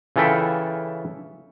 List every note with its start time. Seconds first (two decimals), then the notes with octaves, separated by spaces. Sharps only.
0.16 C#3 E3 F4 A4 E5 G5